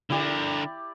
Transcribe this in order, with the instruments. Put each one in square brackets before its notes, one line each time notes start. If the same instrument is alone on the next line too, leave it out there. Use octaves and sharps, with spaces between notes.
[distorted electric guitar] D3 A#4 [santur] E4 G4 D5